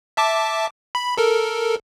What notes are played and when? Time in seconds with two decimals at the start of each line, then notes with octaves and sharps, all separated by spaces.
0.17 E5 A5 D6
0.95 B5
1.17 A4 A#4